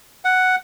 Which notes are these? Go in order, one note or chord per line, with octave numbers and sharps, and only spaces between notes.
F#5